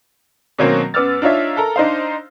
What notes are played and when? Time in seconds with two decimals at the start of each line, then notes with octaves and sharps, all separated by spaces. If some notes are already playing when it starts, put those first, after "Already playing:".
0.59 B2 D#3 F#3 A#3 C4 C#4
0.94 F#2 B3 D6 E6 F6 A6
1.22 D4 D#4 F4 C#5 E5
1.57 A4 A#4 A#5
1.76 D4 D#4 C5 F5